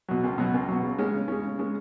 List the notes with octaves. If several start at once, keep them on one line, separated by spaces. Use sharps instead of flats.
B2 F#3
C#2
B2 F#3
C#2
B2 F#3
C#3
G#3 C#4
C#3
G#3 C#4
C#3
G#3 C#4